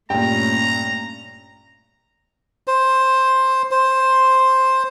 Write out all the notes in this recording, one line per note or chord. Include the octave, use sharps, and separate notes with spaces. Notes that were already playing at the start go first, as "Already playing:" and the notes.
G2 A#2 A3 C#4 G5 A#5
C5
C5